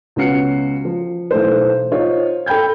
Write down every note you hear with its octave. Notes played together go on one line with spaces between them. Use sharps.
C#2 B3 C#4 F#4 C7 C#7
F3
B1 E3 A3 C5
D#4 F4 C5 C#5
A4 G5 B5 G6 G#6